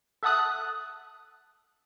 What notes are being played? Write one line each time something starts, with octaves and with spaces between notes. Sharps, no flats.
A4 E5 F#5 A5 D#6 F#6